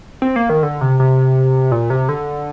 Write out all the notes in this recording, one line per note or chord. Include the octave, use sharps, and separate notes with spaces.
C4
A#3
D#3
D3
C3
C3
A#2
C3
D3